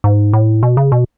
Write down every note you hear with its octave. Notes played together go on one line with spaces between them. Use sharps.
G#2
A2
B2
C#3
B2